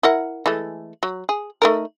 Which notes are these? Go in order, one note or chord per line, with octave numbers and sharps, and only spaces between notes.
E4 A#4 F#5
E3 G#3 A3
F#3
G#4
A3 D#4 A#4